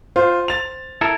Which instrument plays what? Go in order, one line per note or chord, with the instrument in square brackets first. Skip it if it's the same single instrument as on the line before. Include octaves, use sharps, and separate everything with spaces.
[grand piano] F4 [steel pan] C5
[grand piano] A6 F7
[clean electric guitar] E4 A4 A#4